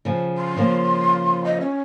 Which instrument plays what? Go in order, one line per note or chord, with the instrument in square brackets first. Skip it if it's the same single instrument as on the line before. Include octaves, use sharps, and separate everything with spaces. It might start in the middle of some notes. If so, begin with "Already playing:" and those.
[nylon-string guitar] C#3 F3
[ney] C6
[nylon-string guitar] C#3 F3 A#3
[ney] D#5
C#4